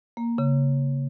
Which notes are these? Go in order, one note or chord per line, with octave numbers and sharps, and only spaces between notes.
A#3
C#3